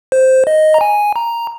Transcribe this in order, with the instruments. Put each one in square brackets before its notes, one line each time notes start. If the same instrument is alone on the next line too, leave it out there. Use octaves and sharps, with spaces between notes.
[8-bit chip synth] C5
D#5
A#5
G#5
A#5